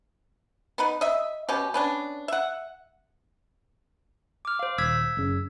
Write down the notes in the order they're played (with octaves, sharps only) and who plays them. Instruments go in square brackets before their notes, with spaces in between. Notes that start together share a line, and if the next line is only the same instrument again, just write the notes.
[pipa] B3 D#4 B4
D#5 E5
B2 C#4 G4
B3 C#4 D4
E5 F#5
[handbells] D6 F6
C5 F5
[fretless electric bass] D#1 [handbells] E6 G#6 B6
[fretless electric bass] F#1 C#3